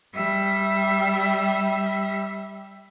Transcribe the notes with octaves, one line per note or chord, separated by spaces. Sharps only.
G3 E5